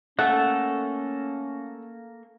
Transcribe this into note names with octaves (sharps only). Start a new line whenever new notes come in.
A3 A#3 C#4 A4 F#5